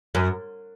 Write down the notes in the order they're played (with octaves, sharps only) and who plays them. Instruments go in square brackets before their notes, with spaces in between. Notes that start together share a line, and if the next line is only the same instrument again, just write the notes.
[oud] F#2